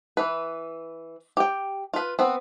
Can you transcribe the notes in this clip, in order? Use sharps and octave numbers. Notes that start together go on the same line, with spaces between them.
E3 B4
G4 G5
F4 B4
B3 C4